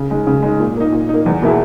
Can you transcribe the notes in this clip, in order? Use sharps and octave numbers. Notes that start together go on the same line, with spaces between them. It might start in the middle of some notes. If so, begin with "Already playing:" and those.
Already playing: C#3
G#3 D#4
C#3
G#3 D#4
A#2
A#3 D#4
A#2
D#4
A#3
E2
B2 A#3 E4 G#4